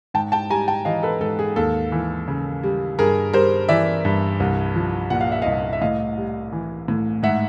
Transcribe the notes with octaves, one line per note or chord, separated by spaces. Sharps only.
G#2 G5 A5
G5 A5
G3 G#5 A#5
G5 A5
E3 D#5 F5
A4 B4
G#2 A4
G#4
D#2 A4
E3
C#3
G3
G2 G#4 A#4
G3 A#4 C5
E3 D5 E5
G2
C2
F3
A#2 F#5
F5
E5
C2 D#5 F5
E5
A2 D#5 F5
G3
E3
A2
G#2 E5 F#5